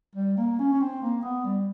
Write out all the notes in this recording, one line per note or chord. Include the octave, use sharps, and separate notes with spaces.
G3
A#3
C#4
C#4
C4
A#3
B3
G3